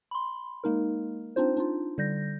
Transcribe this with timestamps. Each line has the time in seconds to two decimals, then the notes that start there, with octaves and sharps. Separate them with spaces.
0.11 B5 C6
0.64 G#3 A#3 D#4 A#4
1.36 C4 D4 D#4 F4 C5
1.57 D4 D#4 F4
1.98 D3 G3 G6 A#6